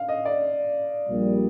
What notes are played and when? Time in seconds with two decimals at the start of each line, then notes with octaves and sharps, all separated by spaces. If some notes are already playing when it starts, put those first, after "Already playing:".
Already playing: F5
0.09 D#5
0.25 D5
1.09 A#1 A#2 G3